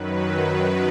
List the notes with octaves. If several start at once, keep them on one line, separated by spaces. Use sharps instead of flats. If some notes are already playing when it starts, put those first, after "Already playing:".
Already playing: F#2 D#3 F#3 B4